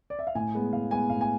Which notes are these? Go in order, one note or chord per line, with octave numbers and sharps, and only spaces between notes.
D5
E5
F5
A2 G#5
G#3 B3
A2 F5
G#3 B3 G#5
A2 F5
G#5